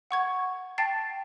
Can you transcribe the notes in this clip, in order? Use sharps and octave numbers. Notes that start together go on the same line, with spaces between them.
F#5 C#6 G#6
G5 A5 A6 C7